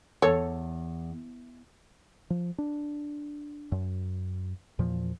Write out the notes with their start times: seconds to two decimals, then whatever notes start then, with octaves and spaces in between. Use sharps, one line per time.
0.22 E2 A4 C#5
2.30 F3
2.58 D4
3.72 F#2
4.79 E2 A#2 F3